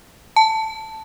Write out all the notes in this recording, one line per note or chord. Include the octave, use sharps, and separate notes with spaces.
A5